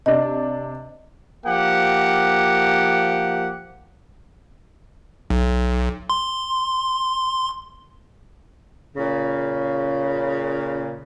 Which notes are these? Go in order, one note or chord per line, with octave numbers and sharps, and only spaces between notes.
C3 D4 D#5
F3 A#3 G4 F#5
B1
C6
A#2 C#3